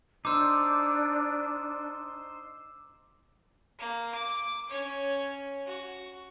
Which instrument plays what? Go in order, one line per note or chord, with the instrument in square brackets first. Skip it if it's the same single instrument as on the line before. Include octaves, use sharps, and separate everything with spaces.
[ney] D4 [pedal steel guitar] D#4 C5 [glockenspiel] D6 E6
[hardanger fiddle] A#3
D6
C#4 C#5
F#4